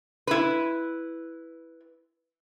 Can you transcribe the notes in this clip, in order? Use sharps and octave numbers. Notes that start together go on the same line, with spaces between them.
E4 B4